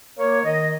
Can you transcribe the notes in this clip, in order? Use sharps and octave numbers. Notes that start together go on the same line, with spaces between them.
A#3 C#5
D#3 D#5